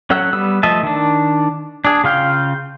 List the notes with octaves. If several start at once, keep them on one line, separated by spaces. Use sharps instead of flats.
F#3 C#4 A4 F#5 E6
G3 B3 E6
F3 A3 D#5 E5 A5
D#3 D4
D4 G#4
C#3 F4 F5 G5